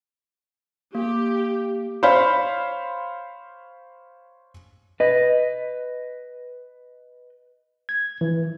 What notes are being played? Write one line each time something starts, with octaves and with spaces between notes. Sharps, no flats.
A#3 G4
C5 C#5 F5 B5
B4 D#5
G#6
E3